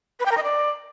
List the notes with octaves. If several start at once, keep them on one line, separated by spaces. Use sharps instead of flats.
B4
G5
A#4
D#5
D5